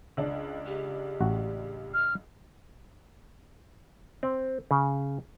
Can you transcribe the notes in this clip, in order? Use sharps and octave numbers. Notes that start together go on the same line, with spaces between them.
C#2 D4
G4
A1 F#4
F6
C4
C#3